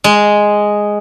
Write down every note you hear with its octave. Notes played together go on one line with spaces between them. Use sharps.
G#3